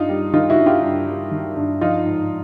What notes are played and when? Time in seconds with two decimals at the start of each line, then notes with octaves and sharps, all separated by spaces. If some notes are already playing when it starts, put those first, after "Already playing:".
Already playing: G2 D#4 F4
0.09 G3
0.33 D#3 D#4 F4
0.50 E4 F#4
0.58 G2
0.66 F4 G4
0.82 G2
1.07 G3
1.31 D#3
1.56 G2
1.81 F3 D#4 F4
2.05 G#2